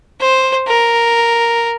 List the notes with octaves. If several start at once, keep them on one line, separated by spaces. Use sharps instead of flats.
C5
A#4